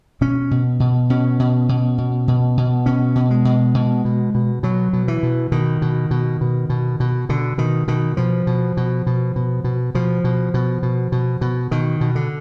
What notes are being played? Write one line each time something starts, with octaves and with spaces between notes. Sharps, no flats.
B2 C#4
B2
B2
B2 C#4
B2
B2
B2
B2
B2
B2 C#4
B2
G#3
B2
B2
B2
B2
B2 F#3
B2
E3
B2
B2 D#3
B2
B2
B2
B2
B2
B2 D3
B2 D#3
B2 D#3
B2 F3
B2
B2
B2
B2
B2
B2 F3
B2
B2
B2
B2
B2
B2 D#3
B2
D3